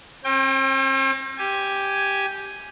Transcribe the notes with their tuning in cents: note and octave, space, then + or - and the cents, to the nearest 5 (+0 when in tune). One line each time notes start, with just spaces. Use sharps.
C4 +45 G5 +20
G4 +0 G#5 +0